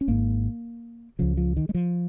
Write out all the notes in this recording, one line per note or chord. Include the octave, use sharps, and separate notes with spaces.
C#4
G#1 G#2 A#3
C#2 C#3 F3
F3
D#3
G#3
F3